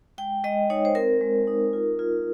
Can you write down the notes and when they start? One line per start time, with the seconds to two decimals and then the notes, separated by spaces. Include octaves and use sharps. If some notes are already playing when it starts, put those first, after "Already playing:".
0.18 G#3 G5
0.44 G#3 D#5
0.70 D#4 C#5
0.85 C5
0.95 C4 A#4
1.21 G#3
1.47 D#4
1.73 F4
1.99 F4